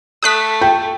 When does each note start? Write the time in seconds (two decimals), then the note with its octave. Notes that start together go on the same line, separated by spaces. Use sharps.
0.23 A3 D#6 F#6 B6
0.61 G5